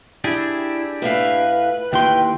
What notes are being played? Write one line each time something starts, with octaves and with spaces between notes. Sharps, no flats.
D4 E4 G4 G#4
A2 B4 E5 F5
D#2 A2 G5 C6